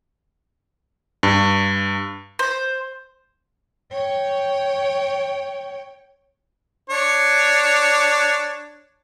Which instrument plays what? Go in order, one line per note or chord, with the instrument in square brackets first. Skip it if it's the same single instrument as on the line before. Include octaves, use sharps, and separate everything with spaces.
[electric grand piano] G2
[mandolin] C5
[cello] C#5 G5
[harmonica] D4 C#5